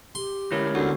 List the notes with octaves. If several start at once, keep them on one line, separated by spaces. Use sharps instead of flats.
G4 C6
D3 G#3 C#4 E4 A#4 C#5
D2 B3 F#4